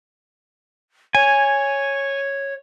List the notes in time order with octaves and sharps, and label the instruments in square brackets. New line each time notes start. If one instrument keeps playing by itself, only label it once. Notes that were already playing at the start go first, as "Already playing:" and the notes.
[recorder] C#5 [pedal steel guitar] G#5